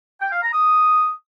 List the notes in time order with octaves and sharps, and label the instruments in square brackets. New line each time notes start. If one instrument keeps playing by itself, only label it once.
[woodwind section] G5
F5
A#5
D#6